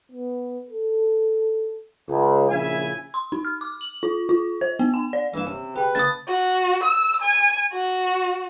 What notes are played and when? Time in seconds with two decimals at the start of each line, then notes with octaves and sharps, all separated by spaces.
0.12 B3
0.69 A4
2.09 C#2
2.50 A#1 C#3 E4 E5 G#5
3.14 C6
3.32 D#4
3.45 F6
3.61 D6
3.81 F#7
4.03 F4
4.29 F4
4.61 C5
4.79 B3
4.94 G#5
5.13 D5
5.34 G2 E3 A#3 E6 E7
5.47 C3 C#4
5.76 G4 G#4 B4 G5 A5
5.95 C#3 A#3 E4 A5 D#6 A6
6.28 F#4
6.84 E6
7.22 G#5
7.73 F#4